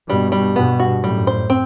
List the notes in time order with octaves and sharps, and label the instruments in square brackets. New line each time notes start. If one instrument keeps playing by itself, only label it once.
[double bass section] G2 B2 [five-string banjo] G3
[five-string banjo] G3
[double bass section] G2 B2 [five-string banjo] B3
[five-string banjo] F#4
[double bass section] F#2 A2 [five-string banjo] G3
[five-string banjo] C5
C4